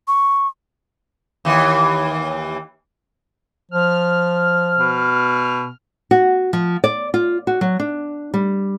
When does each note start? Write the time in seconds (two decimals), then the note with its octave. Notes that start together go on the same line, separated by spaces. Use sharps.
0.08 C#6
1.45 D#2 E3
3.71 F3 F6
4.78 B2
6.11 F#4
6.53 F3
6.84 D5
7.14 F4
7.47 F#4
7.61 F#3
7.80 D4
8.34 G3